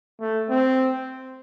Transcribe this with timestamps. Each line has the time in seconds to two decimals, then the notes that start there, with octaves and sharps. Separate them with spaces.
0.20 A3
0.49 C4